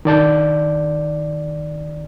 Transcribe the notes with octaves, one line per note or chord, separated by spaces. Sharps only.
D#3 D5 A5 G6